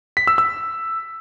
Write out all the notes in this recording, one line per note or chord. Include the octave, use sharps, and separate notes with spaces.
B6
E6
E6